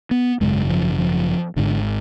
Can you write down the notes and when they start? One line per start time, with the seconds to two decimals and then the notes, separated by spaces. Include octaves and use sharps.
0.11 B3
0.40 G#1 F#2 C#3 G#3
0.70 F3
0.98 F3
1.56 G#1 G#2 D3